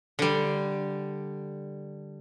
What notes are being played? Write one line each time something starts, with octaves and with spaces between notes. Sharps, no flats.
D3 G3